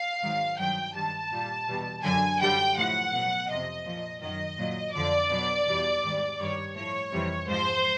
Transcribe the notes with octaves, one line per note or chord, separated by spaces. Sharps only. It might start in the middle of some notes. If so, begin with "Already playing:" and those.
Already playing: F5
G#2 D#3 F#3
G2 D#3 F#3 G5
G2 D#3 G3 A5
A#2 G3
E2 B2 G3
F#2 D3 F#3 G#5
F#2 D3 G3 G5
A2 F3 F#5
B2 F#3
F2 C3 F3 D#5
A#2 F3
F#2 D#3 F#3 D#5
A#2 F#3
F2 D3 F3 D5
B2 F#3
E2 B2 G3
G#2 D#3 G3
G2 D#3 G3 C#5
A2 F3 C#5
F2 C3 E3 G3
G#2 F3 C5